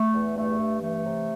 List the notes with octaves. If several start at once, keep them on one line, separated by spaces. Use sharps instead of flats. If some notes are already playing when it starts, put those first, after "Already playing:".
Already playing: A3
E2
G2 A3
G2
E3 A3
C3